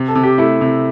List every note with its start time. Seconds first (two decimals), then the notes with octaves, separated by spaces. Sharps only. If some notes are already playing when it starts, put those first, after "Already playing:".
Already playing: C3
0.08 A4
0.15 C3
0.23 G4
0.38 A3 E4
0.61 C3